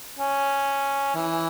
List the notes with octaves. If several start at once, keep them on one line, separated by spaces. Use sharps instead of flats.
C#4
E3